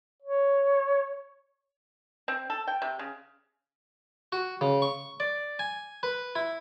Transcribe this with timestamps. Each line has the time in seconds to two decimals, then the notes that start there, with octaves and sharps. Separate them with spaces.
0.23 C#5
2.28 C4
2.50 A4
2.67 G5
2.82 C3
2.99 C#3
4.32 F#4
4.61 C#3
4.82 C#6
5.20 D5
5.59 G#5
6.03 B4
6.35 E4